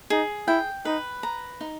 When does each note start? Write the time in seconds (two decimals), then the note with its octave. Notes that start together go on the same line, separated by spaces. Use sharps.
0.10 D#4 G#4
0.48 E4 G5
0.85 D#4 B4
1.23 A#5
1.61 D#4